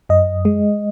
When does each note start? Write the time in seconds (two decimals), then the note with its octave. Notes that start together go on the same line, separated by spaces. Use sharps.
0.09 F#2 D#5
0.45 G#3